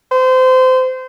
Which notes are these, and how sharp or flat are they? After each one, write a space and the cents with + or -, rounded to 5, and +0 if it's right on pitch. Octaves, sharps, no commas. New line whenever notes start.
C5 -25